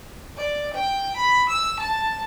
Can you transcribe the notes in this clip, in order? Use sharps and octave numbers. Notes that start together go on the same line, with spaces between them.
D5
G5
B5
E6
A5